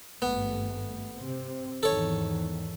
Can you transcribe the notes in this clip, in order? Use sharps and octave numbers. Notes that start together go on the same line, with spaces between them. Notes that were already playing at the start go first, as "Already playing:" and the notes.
G#1 G2 A3 B3
C3 C4
E2 G#2 D#3 A4 C#5